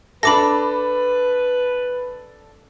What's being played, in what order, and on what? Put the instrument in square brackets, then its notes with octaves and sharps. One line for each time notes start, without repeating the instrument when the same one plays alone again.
[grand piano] D4 A4 [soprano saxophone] B4 [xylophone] B5 D6 A#6